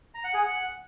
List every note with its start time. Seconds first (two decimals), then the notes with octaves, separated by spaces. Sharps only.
0.14 A#5
0.24 F#5
0.34 G#4
0.44 F#5